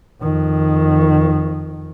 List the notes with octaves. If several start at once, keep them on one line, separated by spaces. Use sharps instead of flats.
F2 D#3